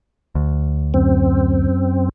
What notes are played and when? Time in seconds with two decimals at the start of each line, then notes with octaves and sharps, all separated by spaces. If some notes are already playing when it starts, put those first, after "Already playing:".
0.35 D2
0.94 F#2 C4